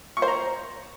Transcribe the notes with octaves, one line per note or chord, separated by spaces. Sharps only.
C#6
C5
A#5